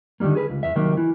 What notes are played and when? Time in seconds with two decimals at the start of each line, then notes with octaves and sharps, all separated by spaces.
0.20 D3 D#3 F#3 G3 A#3
0.35 G#4 B4
0.50 C#2
0.63 E2 E5
0.75 C2 D#3 F#3 A#3
0.97 E3